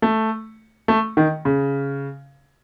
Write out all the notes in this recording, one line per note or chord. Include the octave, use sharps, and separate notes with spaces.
A3
A3
D#3
C#3